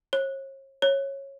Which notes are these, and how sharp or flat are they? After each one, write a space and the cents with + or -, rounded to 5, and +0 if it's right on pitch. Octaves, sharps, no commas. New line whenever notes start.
C#5 -40
C#5 -15